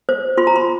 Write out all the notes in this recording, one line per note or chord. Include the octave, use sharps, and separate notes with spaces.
C5
F4 C6
A#5
C6